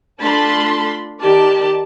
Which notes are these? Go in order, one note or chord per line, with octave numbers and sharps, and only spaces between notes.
A3 D4 F4 A5 B5 C6
D#3 G4 D5 A5